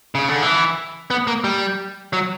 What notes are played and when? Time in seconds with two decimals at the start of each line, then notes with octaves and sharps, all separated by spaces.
0.15 C#3
0.28 D3
0.42 E3
1.11 B3
1.27 A#3
1.44 G3
2.13 F#3